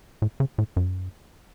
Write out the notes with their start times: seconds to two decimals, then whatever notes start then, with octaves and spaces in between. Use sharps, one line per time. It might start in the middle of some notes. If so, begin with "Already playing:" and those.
0.22 A2
0.40 C#3
0.58 A2
0.76 F#2